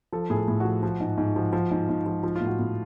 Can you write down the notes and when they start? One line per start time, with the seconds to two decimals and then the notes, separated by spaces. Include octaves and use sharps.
0.13 F3 A4
0.30 A2 G#4
0.37 A4
0.48 A2
0.60 F3 F#4
0.83 F3
1.00 G#2
1.18 G#2
1.36 F3
1.53 F3
1.71 G#2
1.89 G#2
2.06 F3
2.23 F3 F4
2.36 F4
2.41 A2
2.47 F#4
2.59 A2